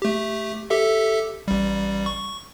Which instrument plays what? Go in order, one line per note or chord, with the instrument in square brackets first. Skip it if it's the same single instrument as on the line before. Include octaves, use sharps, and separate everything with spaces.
[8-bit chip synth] A3 G4
G4 A4 E5
A1 G3
C#6